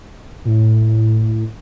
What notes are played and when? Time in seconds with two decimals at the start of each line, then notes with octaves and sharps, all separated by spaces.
0.45 A#2
0.48 A2